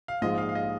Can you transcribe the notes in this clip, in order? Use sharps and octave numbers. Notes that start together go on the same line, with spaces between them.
F5
A#1 G#2 G#3 F4 D#5
F5
F5
D#5